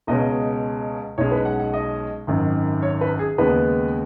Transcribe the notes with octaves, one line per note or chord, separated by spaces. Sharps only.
C#2 B2 G#3 C#4 D#5
B1 B2 G#3 C#4 C#5
B4
F#5
F#5
D#5
G#1 F#2 D#3
C#5
B4
G#4
D#2 C#3 G#3 B3 B4